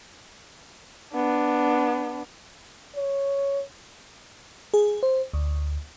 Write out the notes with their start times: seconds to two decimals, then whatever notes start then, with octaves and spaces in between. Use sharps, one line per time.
1.14 B3 D4
2.96 C#5
4.74 G#4
5.03 C5
5.34 D2